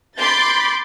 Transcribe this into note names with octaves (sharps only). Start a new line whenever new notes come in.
B5 C6 D6 G6 A6